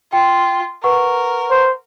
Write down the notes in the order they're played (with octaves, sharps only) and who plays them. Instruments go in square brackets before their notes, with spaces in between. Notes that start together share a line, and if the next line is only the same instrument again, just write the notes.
[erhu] F4 [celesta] G5
[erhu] A#4 [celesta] B4 F#5 C#6
[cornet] C5